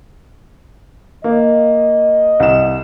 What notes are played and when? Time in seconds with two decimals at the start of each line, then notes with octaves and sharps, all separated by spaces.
1.24 A#3 D#5
2.40 C2 E7